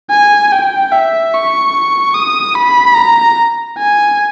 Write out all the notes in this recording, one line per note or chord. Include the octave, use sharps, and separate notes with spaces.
G#5
G5
E5
C#6
D#6
B5
A#5
G#5